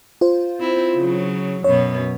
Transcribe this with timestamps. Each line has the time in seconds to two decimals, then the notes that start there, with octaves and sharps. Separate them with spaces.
0.21 F4 C5
0.60 C4 E4
0.96 C#3 F#3
1.64 F#2 B2 B3 C#5